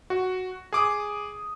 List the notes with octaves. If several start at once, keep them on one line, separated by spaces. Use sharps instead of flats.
F#4
G#4 D6 D#6